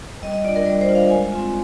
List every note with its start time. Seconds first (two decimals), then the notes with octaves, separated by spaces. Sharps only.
0.22 G3 D#5
0.34 D#5
0.44 D4 F4 D5
0.56 A#4
0.66 G3 D5
0.81 C5
0.89 D4 F4
0.95 F5
1.10 G#3 G#5
1.32 C4 F4 G#5